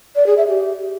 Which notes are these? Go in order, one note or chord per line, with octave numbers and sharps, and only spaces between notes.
D5
G#4
E5
G4